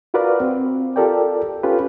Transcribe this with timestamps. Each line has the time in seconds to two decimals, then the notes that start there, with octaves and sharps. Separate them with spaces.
0.14 F4 F#4 A#4 B4 D5 F5
0.40 C4
0.96 F4 G4 A4 A#4 D5 G5
1.63 C#4 F4 G4 A4 B4